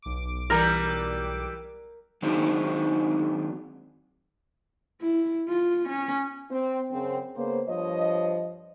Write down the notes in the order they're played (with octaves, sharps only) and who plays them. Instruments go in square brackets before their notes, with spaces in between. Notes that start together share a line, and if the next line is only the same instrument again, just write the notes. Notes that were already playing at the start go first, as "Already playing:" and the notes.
[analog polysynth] B1 D6
[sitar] E3 G3 [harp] A#4
[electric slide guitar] D#3 F#3 G#3 C4 D4 D#4
[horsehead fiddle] E4
F4
C#4
[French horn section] C4
F#2 C#3 C4
C#3 A#3 B3 C5
G2 F3 C5 C#5 D#5